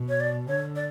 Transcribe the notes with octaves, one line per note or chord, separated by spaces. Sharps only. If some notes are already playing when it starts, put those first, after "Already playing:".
Already playing: B2
C#5
D5
D3 C#5
D5